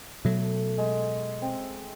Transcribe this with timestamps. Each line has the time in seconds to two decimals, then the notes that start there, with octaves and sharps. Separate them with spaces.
0.25 B2 F#3 A3
0.78 G#3
1.42 C4